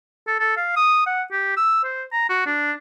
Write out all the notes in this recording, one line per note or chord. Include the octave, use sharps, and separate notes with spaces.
A4
A4
F5
D#6
F#5
G4
E6
C5
A#5
F#4
D4